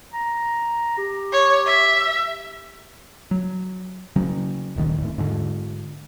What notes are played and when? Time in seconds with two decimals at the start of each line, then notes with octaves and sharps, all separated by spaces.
0.13 A#5
0.98 G4
1.33 C#5
1.66 E5
3.31 F#3
4.16 C#3 F#3 C#4
4.76 D1 A#1 D#3
4.98 D#2 A2
5.18 G#2 D3